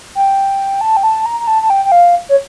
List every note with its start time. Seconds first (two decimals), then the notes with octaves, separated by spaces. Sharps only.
0.15 G5
0.81 A5
0.97 G5
1.03 A5
1.26 A#5
1.40 A#5
1.47 A5
1.62 A5
1.70 G5
1.85 G5
1.92 F5
2.29 C#5